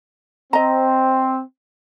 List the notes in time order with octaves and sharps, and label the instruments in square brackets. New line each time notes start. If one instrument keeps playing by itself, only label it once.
[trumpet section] C4 [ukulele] D#5 A#5